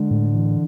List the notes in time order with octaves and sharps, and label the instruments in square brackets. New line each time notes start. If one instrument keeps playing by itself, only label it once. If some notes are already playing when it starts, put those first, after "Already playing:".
Already playing: [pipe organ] D3 [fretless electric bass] G#3
[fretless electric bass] A2
E3